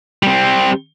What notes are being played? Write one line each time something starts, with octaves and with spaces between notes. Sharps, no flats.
G3 C4